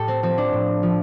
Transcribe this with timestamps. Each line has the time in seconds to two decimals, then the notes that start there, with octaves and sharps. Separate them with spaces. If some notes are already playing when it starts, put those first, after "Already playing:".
Already playing: A2 G4 A4
0.08 C4
0.23 F3 C4
0.38 D4
0.53 A2
0.83 F3